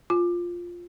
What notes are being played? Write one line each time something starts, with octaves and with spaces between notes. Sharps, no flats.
F4